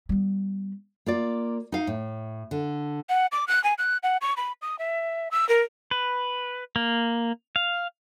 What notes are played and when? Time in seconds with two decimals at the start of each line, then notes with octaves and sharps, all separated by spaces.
0.09 G3 B3
1.06 A#3 F4 D5
1.72 D#4 F5
1.87 A2
2.51 D3
3.09 F#5
3.32 D6
3.48 F#6
3.64 G#5
3.78 F#6
4.03 F#5
4.21 C#6
4.37 B5
4.62 D#6
4.79 E5
5.31 E6
5.49 A#4
5.91 B4
6.76 A#3
7.56 F5